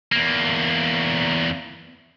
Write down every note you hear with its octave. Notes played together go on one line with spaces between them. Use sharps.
E2 A#3